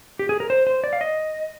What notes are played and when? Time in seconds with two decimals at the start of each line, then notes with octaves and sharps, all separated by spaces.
0.19 G4
0.29 G#4
0.40 A#4
0.50 C5
0.67 C5
0.84 D5
0.93 F5
1.01 D#5